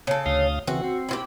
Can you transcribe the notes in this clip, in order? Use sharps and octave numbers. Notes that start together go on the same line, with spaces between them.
C#3 A4
D2 F5 D#6
C#3 E3 C4 F#4
C4
E4 F4 G4